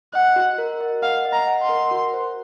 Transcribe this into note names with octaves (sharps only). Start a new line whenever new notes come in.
D#5 F#5
F#4
A#4
D#5
F5 F#5
D#5
A#5
F#5
C6
A#4
F#4
C5